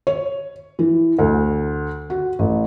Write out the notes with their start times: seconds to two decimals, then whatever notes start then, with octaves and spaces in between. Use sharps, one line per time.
0.07 C#5
0.79 E3
1.19 D2
2.10 F#4
2.39 A1